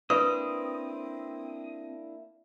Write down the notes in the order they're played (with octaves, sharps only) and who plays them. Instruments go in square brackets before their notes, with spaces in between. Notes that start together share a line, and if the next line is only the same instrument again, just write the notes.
[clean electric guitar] A#3 D4 E4 [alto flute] C4 [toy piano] B4 C#6 [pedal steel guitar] D#6